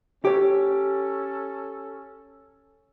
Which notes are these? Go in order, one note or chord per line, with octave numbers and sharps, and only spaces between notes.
C#4 G4 A4 C#5